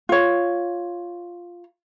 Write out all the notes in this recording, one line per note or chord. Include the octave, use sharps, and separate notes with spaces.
F4 C#5